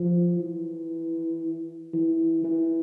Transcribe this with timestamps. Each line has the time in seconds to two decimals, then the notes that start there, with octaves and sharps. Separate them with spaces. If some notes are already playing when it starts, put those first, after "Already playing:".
Already playing: F3
0.40 E3
1.94 E3
2.44 E3